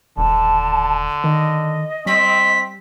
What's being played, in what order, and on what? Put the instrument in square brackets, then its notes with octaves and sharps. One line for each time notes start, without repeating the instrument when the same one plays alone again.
[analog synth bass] D#1 [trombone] D3 [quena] A5
[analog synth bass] D#3 [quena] D#5
[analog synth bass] G3 [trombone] C4 [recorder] B6